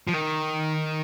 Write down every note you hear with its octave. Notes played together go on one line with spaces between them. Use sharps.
F3
D#3